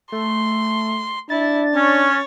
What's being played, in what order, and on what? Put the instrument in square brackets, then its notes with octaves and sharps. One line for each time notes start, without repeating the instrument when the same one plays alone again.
[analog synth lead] A3 [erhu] C6
[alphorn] D4 [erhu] E4 [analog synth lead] A6
[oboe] C#4 [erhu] C#5